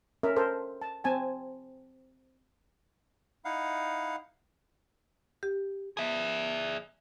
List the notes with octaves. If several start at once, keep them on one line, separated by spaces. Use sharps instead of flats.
C#4 A#4 E5
A4 A#4 C5
A5
C4 G#5 A5
D#4 E4 F5 F#5
G4
G#4 E5